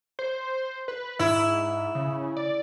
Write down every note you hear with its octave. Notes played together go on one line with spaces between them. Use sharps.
C5
B4
G#2 E4
C#3
D5